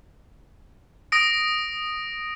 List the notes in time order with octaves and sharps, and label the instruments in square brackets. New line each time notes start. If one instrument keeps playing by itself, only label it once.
[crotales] D#6 A#6 D7